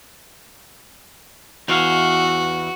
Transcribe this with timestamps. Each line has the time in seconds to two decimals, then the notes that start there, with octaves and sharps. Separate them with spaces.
1.68 E2 E3 F#4 F5